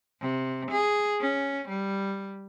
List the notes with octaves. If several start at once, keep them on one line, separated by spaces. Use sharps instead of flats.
C3
G#4
C#4
G3